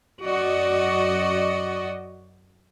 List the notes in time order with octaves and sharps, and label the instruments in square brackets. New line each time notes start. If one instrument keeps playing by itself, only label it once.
[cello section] F#2 F#4 D5 D#5